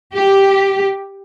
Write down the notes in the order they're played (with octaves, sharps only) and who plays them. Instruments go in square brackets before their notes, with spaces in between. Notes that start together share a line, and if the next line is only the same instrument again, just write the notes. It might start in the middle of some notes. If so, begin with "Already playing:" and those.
[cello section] G4